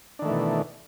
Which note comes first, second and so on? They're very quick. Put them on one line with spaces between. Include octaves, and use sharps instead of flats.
D4 D#3 A3 E3 B2